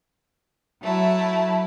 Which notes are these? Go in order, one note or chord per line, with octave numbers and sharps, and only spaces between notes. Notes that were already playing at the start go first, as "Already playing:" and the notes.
F#3 A3 E4